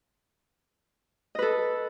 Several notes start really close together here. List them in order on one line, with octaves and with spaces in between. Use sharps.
D#5 B4 A4